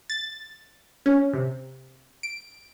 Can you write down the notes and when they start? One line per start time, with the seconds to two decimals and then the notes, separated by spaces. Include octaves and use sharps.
0.10 A6
1.06 C#4
1.33 C3
2.23 D7